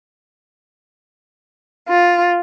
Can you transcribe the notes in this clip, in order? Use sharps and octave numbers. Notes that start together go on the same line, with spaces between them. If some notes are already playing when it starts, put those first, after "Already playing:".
F4